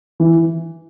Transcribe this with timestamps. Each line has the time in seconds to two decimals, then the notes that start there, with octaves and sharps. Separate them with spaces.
0.20 E3